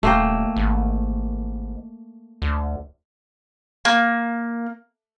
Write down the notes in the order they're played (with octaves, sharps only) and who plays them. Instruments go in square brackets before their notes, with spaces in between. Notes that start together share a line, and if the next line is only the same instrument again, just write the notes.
[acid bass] D#1 [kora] A3 A#3 G5
[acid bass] G#1
D2
[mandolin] A#3